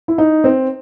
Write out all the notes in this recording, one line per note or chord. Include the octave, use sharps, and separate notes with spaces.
E4
D#4
C4